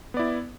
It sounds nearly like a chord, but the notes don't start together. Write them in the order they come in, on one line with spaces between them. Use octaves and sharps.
B3 D5 E4